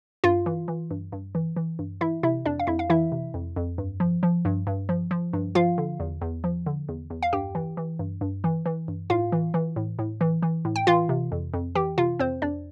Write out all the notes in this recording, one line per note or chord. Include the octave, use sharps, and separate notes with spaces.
G2 F4 F5
E3
E3
G2
G2
E3
E3
G2
E3 E4 E5
C3 E4 E5
F2 D4 D5
F5
F2 E4 E5
F5
E3 E4 E5
C3
F2
F2
G2
F3
F3
G2
G2
F3
F3
G2
F3 F4 F5
D3
E2
E2
F3
D3
E2
E2
F5
G2 G4 G5
E3
E3
G2
G2
E3
E3
G2
A2 F4 F5
E3
E3
A2
A2
E3
E3
A2
G5
E3 F4 F5
C3
F2
F2
E3 G4 G5
C3 F4 F5
F2 C4 C5
F2 D4 D5